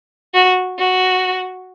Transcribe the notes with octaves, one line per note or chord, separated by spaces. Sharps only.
F#4
F#4